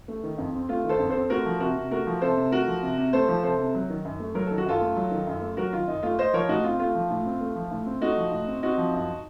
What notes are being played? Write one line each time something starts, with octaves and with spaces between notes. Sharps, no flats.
A3
D#3
F2
C4
A3 F4
D#3
A4 C5
F2
C4 A4 C5
A3 F#4 A#4
F3
C3 F#4 A#4
C3
A3 F#4 A#4
F3
C3 A4 C5
C3
A3 F#4 A#4
F3
C3
C3
A3 A4 C5
F3
C3 A4 C5
C3
F#3
D#3
F#2
A3
F#3 A#4
D#3 A4
F#4
F#2 F4 A4
A3
F#3
D#3
F#2
A3
F#3 F#4 A#4
D#3 F4
F#2 D#4
A3 F4
A3 C5 D#5
F3 A#4 C#5
A2 D#4 F#4
C4 F4
A3 F4
F3
A2
C4
A3
F3
A2
C4
A3 D#4 F#4
F3
A2
C4
C4 D#4 F#4
F3
F#2